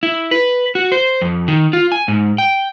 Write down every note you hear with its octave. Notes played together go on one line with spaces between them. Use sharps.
E4
B4
F#4
C5
F2
D#3
F4
G#5
G#2
G5